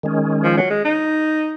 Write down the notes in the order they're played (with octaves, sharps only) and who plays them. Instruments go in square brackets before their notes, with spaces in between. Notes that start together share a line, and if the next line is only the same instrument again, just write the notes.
[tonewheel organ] D#3 G#3 C#4
[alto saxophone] F3
F#3
G#3
D#4